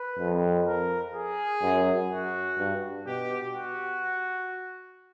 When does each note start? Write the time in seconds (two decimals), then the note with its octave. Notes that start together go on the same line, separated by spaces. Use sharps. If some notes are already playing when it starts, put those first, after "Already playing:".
Already playing: B4
0.19 F2
0.66 A#4
1.15 G#4
1.62 F#2
2.11 F#4
2.58 G2
3.07 B2 G4
3.55 F#4